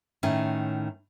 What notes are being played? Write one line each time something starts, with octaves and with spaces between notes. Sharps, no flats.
A2 D#3 C#4